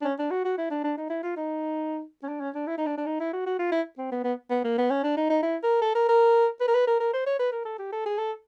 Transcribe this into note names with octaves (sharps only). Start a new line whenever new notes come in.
D4
C#4
D4
F#4
F#4
E4
D4
D4
D#4
E4
F4
D#4
C#4
D4
C#4
D4
E4
D#4
D4
D4
D#4
E4
F#4
F#4
F4
E4
C4
B3
B3
B3
A#3
B3
C#4
D4
D#4
D#4
E4
A#4
A4
A#4
A#4
B4
A#4
B4
A#4
A#4
C5
C#5
B4
A#4
A4
G4
A4
G#4
A4